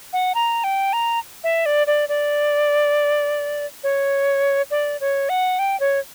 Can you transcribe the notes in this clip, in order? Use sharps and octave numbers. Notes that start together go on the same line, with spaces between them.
F#5
A#5
G5
A#5
E5
D5
D5
D5
C#5
D5
C#5
F#5
G5
C#5